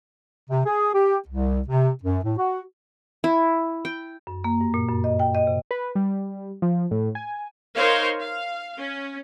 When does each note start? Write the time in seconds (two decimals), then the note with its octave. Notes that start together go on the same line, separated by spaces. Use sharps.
0.50 C3
0.66 G#4
0.94 G4
1.29 C2
1.69 C3
2.04 F#2
2.24 A2
2.38 F#4
3.24 E4
3.85 G5
4.27 F#2
4.44 A#3
4.61 G2
4.74 A#2
4.88 F#2
5.04 D#5
5.19 G5
5.35 D#5
5.47 C3
5.71 B4
5.95 G3
6.62 F3
6.91 A2
7.15 G#5
7.75 D#4 A#4 C5 C#5 D#5 F5
8.21 F5
8.78 C#4